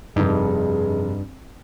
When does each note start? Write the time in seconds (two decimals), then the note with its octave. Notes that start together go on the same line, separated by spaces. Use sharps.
0.16 F1 G2 D#4 G#4